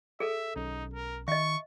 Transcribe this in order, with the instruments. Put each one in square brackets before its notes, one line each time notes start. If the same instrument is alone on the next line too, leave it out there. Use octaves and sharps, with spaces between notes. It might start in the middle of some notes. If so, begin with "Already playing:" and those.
[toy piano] G#4 A4 [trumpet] E5
[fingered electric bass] B1 C#4 [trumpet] D#4
[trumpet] A#4
[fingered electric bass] D#3 [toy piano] D#5 E5 [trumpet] C#6